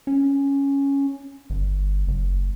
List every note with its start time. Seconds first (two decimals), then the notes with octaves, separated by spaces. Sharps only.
0.07 C#4
1.50 G1
2.08 F#1